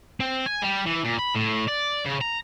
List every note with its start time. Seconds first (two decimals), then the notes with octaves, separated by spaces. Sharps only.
0.20 C4
0.46 G#5
0.62 G3
0.86 E3
1.04 A#2
1.18 B5
1.35 A2
1.67 D5
2.05 C#3
2.21 A#5